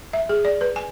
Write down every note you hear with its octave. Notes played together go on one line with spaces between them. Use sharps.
E5
G#4
D5
B4
G#5